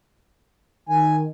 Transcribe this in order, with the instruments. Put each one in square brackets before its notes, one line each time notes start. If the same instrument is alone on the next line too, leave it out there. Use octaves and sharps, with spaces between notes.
[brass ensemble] D#3 [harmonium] G#5